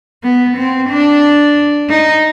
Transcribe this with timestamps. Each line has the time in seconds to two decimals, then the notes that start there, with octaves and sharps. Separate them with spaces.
0.23 B3
0.57 C4
0.90 D4
1.89 D#4